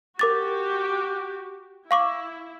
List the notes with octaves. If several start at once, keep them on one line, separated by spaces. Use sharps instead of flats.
F#4 G4 A#4 D6 A6
E4 F5 C#6 D6